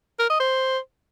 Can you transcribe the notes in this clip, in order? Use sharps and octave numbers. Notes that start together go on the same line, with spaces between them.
A#4
D#5
C5